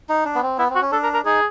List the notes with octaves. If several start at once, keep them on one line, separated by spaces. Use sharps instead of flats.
D#4
D4
B3
C4
B3 E4
C4
F#4
C#4
D4 A4
A#4
A#4
D#4 G#4